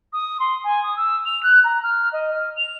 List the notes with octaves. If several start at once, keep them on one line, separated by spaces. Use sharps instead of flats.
D#6
C6
G#5
D#6
E6
F7
F#6
A#5
F6
D#5
F6
F7